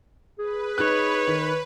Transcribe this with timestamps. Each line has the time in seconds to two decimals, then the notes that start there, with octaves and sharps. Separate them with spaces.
0.39 G#4 B4
0.78 D#4 C#5 F#6
1.27 D#3